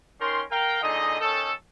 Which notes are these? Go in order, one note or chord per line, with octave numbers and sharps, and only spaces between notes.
D#3 C#4 A#4 C6
A#4 F5 G5
A#2 D3 D#4 G#4 D#5
D#3 C#4 D#4 A4